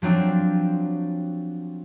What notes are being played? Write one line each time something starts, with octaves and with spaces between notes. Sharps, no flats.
F3 F#3 C4 D4